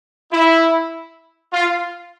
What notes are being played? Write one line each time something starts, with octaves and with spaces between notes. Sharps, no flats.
E4
F4